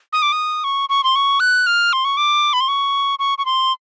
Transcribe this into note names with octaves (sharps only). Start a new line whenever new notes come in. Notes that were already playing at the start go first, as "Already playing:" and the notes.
D#6
D6
D#6
C#6
C#6
C6
C#6
F#6
F6
C6
C#6
D6
B5
C6
C#6
C#6
C#6
C6